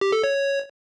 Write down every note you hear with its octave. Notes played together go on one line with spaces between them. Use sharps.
G4
A4
C#5